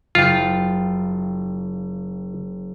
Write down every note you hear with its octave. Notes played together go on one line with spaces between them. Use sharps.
F#1 F4 G5